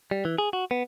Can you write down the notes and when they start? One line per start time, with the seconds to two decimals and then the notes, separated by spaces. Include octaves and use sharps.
0.11 G3
0.25 E3
0.38 G#4
0.53 F#4
0.71 B3